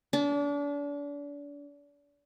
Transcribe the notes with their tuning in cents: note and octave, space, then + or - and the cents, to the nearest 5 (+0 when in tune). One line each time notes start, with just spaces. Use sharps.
D4 -35